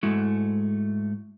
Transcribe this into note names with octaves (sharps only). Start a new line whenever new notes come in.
G#2 G#3 A3 E4 F#4